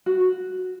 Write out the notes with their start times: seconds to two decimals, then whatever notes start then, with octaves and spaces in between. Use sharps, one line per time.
0.06 F#4